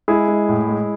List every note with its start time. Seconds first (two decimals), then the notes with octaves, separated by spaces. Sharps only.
0.08 G#3 E4 G#4
0.28 G#3
0.49 A2
0.69 G#3